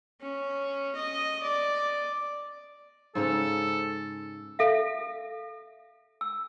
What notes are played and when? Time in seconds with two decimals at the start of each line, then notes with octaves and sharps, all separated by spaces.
0.21 C#4
0.95 D#5
1.43 D5
3.15 G#2 C#3 C#4 A4
4.59 A4 E5 F5
6.21 E6